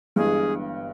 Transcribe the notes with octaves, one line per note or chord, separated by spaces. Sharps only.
G1 G2 E3 G#3 G#4